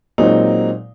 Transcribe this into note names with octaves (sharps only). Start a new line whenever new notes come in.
A#2 F#3 G#3 C4 D#4